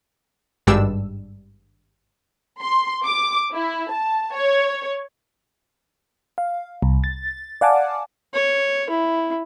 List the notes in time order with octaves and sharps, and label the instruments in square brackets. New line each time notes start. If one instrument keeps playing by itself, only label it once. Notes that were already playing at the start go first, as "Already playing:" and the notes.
[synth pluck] G#1 G2 G3 G#3 D4 E6
[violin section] C6
D6
E4
A5
C#5
[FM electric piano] F5
C2
A6
D5 F5 F#5 G#5 A5 D6
[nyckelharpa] C#5
E4